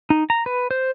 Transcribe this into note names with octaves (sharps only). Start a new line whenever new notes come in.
D#4
A#5
B4
C5